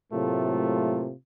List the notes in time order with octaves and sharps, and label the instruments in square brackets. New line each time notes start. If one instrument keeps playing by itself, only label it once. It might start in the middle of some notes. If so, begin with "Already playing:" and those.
[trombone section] A2 C3 F#3 A3 A#3 F4